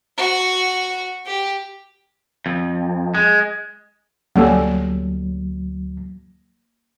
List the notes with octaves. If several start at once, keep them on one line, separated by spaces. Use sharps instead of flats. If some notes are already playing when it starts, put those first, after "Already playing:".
F#4
G4
F2
G#3
D2 F#3 G3 A#3 C#4 A4